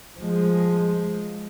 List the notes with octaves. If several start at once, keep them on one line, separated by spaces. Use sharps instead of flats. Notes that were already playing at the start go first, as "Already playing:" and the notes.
F3 G#3